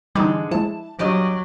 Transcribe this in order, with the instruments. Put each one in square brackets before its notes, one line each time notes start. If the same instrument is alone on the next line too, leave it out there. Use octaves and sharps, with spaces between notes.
[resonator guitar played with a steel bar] G#2 D3 G#3 [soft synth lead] E3 [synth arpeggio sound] G3 D#4
[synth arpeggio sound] F3 G#3 [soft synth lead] E4 [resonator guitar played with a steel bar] A5
[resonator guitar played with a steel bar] G2 G4 D#5 [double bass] F#3 [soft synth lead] D6